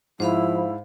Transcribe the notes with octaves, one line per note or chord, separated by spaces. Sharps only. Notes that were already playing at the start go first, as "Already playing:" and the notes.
G#2 F3 E4 C5 F5 B5